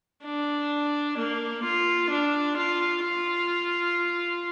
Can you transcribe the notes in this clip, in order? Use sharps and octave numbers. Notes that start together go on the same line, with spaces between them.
D4
A#3
F4
D4
F4
F4